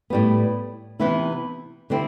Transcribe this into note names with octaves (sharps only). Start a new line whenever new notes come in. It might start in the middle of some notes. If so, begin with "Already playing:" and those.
A2 G3 B3
C3 E3 B3 E4
D3 G3 C4 E4